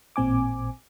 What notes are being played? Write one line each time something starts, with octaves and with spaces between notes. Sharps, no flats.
A1 A#2 C4 G#5 D6